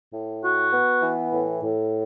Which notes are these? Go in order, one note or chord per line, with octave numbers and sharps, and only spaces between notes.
A2
F#4
B3
E3
A2
A2